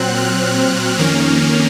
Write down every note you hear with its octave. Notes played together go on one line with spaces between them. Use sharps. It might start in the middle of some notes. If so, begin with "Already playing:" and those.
Already playing: A#2 F#3 C4 F#6
F6
F#6
F2 D#3 A#3 C#4 F6